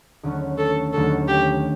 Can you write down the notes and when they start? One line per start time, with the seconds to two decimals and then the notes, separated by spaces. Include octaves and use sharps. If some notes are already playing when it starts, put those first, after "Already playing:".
0.23 D#2 D3 F#3 A3 C#4
0.58 A4
0.93 D#2 D3 F#3 A3 C#4 A4
1.28 G4